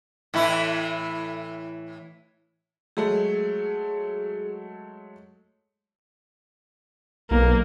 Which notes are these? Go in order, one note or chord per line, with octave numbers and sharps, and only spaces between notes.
A2 E3 E4
F#3 G#3 A3 G#4
B1 A#3